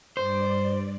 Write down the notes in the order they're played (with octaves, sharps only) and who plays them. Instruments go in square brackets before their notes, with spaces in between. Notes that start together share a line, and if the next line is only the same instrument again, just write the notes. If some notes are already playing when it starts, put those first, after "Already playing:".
[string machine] G2 D5 [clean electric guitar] C5